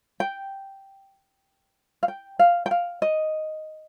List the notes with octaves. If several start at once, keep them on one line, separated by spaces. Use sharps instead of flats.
G5
F5
G5
F5
G5
F5
D#5